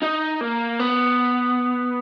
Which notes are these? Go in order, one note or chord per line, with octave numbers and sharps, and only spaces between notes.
D#4
A#3
B3